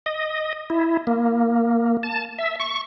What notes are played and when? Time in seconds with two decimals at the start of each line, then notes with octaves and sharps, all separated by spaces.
0.06 D#5
0.70 E4
1.07 A#3
2.03 A5
2.38 E5
2.60 C#6